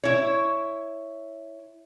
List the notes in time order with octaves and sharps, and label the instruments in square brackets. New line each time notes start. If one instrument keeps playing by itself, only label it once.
[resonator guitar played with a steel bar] E4 C#5